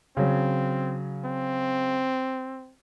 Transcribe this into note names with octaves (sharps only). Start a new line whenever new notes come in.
C#3 F#3 C4
C4